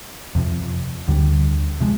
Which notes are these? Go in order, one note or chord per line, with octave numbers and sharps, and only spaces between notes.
F2 C3 F3
D2 D3 G3
C3 F3 G#3